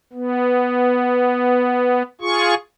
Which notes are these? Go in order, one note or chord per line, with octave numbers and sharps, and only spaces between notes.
B3
F4 G#4 C#6